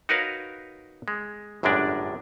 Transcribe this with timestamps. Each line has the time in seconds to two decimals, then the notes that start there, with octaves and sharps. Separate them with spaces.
0.09 D#4 F#4 A#4 B4 C#5 F5
1.08 G#3
1.63 G1 F#2 A2 G#3 D4 D5